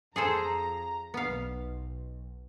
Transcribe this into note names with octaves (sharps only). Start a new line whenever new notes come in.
F2 G#4 A4 C5 A#5
B1 B3 F5